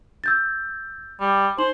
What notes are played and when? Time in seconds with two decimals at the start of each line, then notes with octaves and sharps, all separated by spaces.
0.24 E6 G6 A6
1.20 G3
1.58 D#4 C5 F#7